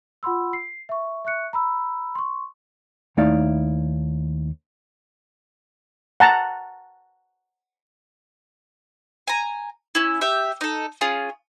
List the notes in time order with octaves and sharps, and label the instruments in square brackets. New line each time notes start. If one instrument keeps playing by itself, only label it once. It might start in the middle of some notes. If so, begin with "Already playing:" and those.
[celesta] F4 F#5 B5 C6 E6
C7
E5 C#6
E5 C#6 F#6 C#7
A#5 B5 E6
C6 C#6
[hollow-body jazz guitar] D#2 A3 D#4 E4 D5 F5
[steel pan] F#5 A5 A#5
[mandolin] G#5 A#5
C#4 E4
G4 E5
D#4 A4
C#4 F4 G#4